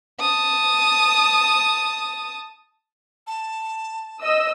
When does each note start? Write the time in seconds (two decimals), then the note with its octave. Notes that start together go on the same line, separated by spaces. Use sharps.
0.20 A5 D#6
3.27 A5
4.22 D#5 E6